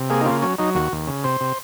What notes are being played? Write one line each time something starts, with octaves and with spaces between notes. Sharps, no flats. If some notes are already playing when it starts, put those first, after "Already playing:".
Already playing: C3
A#3 G#4
D#4
C#3 F4
F#3 C#4
F#3 D#4
D#2 F#4
D#2
C#3
C3 C5
C3